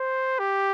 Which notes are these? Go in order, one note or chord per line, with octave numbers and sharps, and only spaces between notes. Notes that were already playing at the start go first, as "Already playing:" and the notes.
Already playing: C5
G4